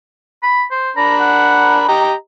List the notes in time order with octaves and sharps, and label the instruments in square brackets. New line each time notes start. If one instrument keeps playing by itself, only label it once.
[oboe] B5
C5
[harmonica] D4 A#4 B5 [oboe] A#5
[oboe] F#5
[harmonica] G4 D#5 A#5